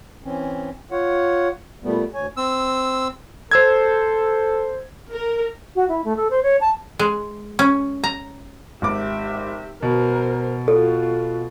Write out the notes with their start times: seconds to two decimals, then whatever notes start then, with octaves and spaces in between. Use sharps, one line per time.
0.25 E3 C4 C#4
0.91 F4 C#5 F#5
1.84 A#2 G3 A3 B3
2.14 D2 C#5 G#5
2.37 C4 E6
3.51 A4 C5 E6 G#6
5.11 A#4
5.75 F#4
5.89 E4
6.04 A3
6.17 A4
6.30 C5
6.43 C#5
6.61 A5
6.99 G#3
7.59 C#4
8.04 A#5
8.82 G#1 G4 E5 D6
9.83 B2 A#4 C5
10.68 F4 F#4 A4